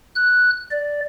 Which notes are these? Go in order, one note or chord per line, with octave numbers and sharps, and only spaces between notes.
F#6
D5